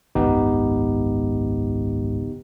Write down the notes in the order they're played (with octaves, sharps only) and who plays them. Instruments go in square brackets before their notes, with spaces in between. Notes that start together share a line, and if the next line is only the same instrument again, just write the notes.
[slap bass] G#1 C#2 F#2 [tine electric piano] B3 D#4 G4